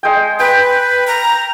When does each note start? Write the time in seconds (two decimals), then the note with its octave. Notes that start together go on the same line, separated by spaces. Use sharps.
0.03 G#3 G5
0.39 B4 G5
1.07 A#5